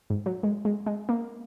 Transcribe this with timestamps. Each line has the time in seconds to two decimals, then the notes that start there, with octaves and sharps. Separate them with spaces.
0.10 G#2
0.26 F#3
0.43 G#3
0.65 G#3
0.86 G#3
1.09 A#3